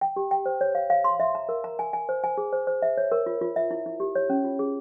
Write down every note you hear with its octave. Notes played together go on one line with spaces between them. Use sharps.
G5
G4
G5
C5
C#5
F5
F5
C6
E5
A#5
A#4
A#5
G#5
G#5
C5
G#5
G#4
C5
C5
E5
C#5
A#4
F4
F4
E5
E4
E4
G4
C#5
C#4
F4
G#4